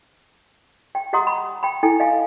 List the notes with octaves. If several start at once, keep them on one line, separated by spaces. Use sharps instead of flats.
G5
G4 D#5 F#5 A#5 C6 D#6
B5
G5 B5
E4 A4 G5 G#5
D#5 F5 G#5